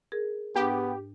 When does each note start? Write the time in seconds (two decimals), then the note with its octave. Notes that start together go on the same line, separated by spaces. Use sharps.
0.12 G#4 A#4
0.55 G#2 B3 D4 G4 G5